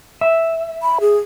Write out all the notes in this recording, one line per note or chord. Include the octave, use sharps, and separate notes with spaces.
E5
B5
G#4